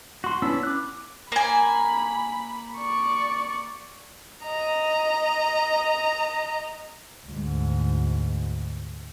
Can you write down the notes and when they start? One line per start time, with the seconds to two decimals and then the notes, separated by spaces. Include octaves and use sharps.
0.24 F#4 C6
0.42 B3 C#4 D4 E4 E6
0.63 D6 F#6
1.32 A#3 G#5 B5
2.77 D5 C#6
4.44 D#5 A#5
7.27 D2 G#2